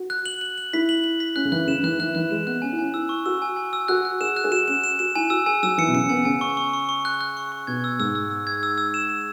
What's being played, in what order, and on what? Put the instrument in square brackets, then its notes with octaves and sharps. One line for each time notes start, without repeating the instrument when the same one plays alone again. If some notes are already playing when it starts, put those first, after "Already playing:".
Already playing: [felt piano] F#4
[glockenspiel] F#6
F#7
F#7
F#7
[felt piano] E4 [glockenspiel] B6
[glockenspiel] F#7
F#7
B6
[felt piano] C#4 [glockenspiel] F#6
[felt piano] C#3
[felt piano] E3 [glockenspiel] F#6
[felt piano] C#3 [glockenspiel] E7
[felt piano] C#3
[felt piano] E3 [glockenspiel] F#6
[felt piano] E3 [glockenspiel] F#6
[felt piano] E3 [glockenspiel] F#6
[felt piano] G#3 [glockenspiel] E7
[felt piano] B3 [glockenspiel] F#6
[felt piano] C#4 [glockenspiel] G#5
[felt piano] E4
[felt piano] C#4 [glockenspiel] G#5
[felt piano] E4 [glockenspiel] E6
[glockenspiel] C#6
[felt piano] F#4 [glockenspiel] E6
[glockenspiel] G#5
G#5
E6
[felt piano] F#4 [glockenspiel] F#6
[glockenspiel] F#6
[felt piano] G#4 [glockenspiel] E7
[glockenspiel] F#6
[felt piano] G#4
[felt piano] F#4 [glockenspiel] E7
[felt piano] C#4 [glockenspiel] E7
[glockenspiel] E7
[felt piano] F#4 [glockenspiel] E7
[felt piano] E4 [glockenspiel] G#5
[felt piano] F#4 [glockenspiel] E6
[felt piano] G#4 [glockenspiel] G#5
[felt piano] F#3 [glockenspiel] E6
[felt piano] E3 [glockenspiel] C#7
[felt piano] B2
[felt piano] C#3 [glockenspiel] C#7
[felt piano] C#4
[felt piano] B3 [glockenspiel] G#5
[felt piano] C#3 [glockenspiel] G#5
[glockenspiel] C#6
C#6
C#6
C#6
F#6
F#6
C#6
C#6
[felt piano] B2 [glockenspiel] G#6
[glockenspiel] E6
[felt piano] G#2 [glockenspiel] E6
[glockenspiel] E6
E6
G#6
E6
E6
E7
E7